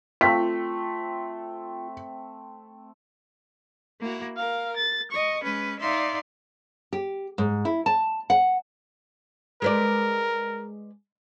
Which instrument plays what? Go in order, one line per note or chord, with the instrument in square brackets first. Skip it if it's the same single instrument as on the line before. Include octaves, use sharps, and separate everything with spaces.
[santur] A3 C4 [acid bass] F4 [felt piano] B6
[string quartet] A#3 E4 F#4
A#4 F5
A6
D#5 C#6
G#3 C#4 B4
D#4 D5 E5 F5 C6
[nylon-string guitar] G4
G#2
E4
A5
F#5
[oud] G#3 B4 D5 [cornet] A#4